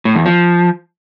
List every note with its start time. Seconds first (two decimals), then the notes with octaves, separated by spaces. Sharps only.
0.05 A2
0.16 E2
0.26 F3